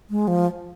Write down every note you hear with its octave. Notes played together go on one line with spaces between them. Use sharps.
G#3
F3